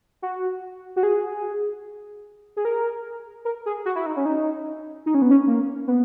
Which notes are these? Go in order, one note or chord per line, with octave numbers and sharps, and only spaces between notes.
F#4
F#4
G#4
G#4
A#4
A#4
G#4
F#4
E4
D#4
C#4
D#4
D#4
C#4
B3
C#4
A#3
B3